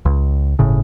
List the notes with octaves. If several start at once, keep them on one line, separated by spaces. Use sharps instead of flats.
C#2
G1 A2 C#3